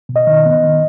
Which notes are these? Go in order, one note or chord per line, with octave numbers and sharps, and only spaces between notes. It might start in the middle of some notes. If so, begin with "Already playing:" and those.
B2
D#5
D#3
B3
D#3